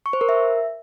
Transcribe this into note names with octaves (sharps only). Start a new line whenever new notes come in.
C#6
C5
A#4
E5